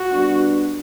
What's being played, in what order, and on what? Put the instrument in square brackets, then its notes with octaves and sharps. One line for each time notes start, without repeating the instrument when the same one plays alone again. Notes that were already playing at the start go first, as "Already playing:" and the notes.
Already playing: [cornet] F#4
[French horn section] B2 G3 B3 D4